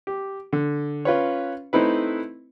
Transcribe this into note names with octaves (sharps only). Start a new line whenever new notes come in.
G4
D3
C#4 F4 B4 C#5
A3 C4 D#4 E4 B4